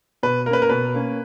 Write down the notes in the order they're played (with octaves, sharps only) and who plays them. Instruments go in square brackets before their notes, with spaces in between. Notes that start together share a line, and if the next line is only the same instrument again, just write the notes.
[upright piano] B2 [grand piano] B4
[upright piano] A#3 [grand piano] A#4
[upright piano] C#4 [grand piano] B4
[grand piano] A#4
[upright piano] B2 [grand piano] B4
[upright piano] A#3 C#4